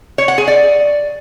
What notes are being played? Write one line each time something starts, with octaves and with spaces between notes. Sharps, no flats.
C#5
F#5
G#4
D5